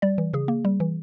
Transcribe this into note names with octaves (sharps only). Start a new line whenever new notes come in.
G3 D5
E3
C#3 G#4
A#3
G3
E3